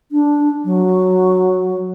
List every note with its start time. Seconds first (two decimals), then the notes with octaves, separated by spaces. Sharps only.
0.12 D4
0.64 F#3